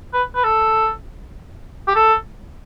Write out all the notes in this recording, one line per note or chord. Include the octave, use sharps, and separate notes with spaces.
B4
B4
A4
G4
A4